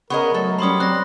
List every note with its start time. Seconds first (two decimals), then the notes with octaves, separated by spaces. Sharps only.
0.10 C#3 B3 G#4 A#4 D#5 C#6
0.34 F#3 A3 A4
0.59 G3 C#4 C5 B5 C6 D#6
0.80 C4 F#6 A#6